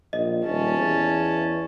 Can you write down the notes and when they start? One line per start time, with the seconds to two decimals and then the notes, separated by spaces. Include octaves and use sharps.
0.13 A#1 D#5
0.46 D#1 C#4 A5
0.77 E2